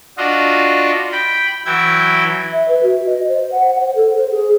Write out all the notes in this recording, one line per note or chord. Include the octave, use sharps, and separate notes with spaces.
D4 F4 F#4 D#5
G5 B5
E3 F#3 E4 G5 G#6
E5
B4
F#4
D#5
C5
F#5
F#5
C5
A4
C5
G#4